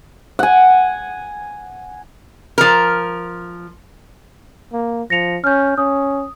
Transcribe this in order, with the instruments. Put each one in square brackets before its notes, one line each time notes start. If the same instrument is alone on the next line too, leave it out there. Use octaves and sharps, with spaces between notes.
[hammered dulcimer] F#5 G#5
[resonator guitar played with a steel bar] F3 A#4
[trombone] A#3
[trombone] F3 [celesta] A#6 C#7 F7
[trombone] C#4 [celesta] F6 G6
[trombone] C#4 [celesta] D#6